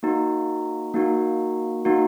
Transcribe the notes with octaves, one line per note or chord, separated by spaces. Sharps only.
A#3 D#4 F#4
A#3 D#4 F#4
A#3 D#4 F#4